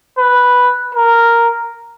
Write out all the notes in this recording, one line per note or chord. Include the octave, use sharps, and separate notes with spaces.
B4
A#4